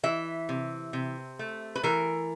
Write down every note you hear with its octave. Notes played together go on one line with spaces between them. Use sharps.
E3 E5
C3
C3
A3
B4
E3 A#4